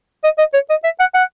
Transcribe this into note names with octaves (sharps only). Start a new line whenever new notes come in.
D#5
D#5
C#5
D#5
E5
F#5
F#5